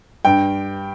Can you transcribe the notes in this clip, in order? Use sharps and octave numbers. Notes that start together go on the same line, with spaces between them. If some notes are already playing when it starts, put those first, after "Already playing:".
G2 G5